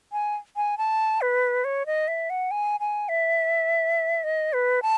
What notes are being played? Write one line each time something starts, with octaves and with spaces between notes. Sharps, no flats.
G#5
G#5
A5
B4
C#5
D#5
E5
F#5
G#5
G#5
E5
D#5
B4
A5